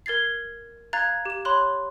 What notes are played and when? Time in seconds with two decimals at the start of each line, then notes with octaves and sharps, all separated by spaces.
0.06 A#4 G#6 A6 C7
0.93 F5 A#5 F#6 G#6 A6
1.25 G4 E7
1.45 C#5 B5 C6 F#6